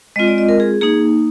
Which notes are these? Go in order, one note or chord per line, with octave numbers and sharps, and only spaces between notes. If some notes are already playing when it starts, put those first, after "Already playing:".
G#3 C4 F4 D#5
D5
D#5
A#4
G#4
A#3 D#4 G#4